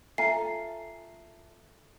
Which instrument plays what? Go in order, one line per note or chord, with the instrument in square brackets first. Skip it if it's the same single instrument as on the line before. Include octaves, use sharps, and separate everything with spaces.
[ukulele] F4 G#5 [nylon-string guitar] A4 [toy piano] E5 A#5 [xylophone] C7